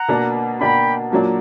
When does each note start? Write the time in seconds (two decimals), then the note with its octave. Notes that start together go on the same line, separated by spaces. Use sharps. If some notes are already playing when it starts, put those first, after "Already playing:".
Already playing: F#5 A#5
0.08 B2 A#3 D4
0.60 B2 A#3 D4 G5 B5
1.11 A#2 F#3 A#3 D4